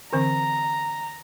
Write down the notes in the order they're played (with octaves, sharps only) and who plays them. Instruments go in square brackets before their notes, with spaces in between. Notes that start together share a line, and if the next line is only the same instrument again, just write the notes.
[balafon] D3 E3 C4 [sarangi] A#5